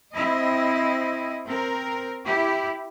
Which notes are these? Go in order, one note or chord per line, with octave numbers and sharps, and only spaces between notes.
C4 E4 D#5
C4 A#4
E4 G4